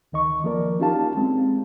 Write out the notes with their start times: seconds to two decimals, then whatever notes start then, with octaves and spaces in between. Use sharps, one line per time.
0.12 D2 D#3 D#5 C#6
0.44 F3 A#3 A#4 D5
0.80 C#4 D#4 F4 G4 F5 A5
1.17 G#3 C4